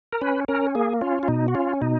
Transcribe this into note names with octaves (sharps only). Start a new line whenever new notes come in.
A#4
C#4 B4
C#4 A#4
A#3 G#4
C#4 F4
F4
B2 D#4
F#4
C#4 F4
B2 D#4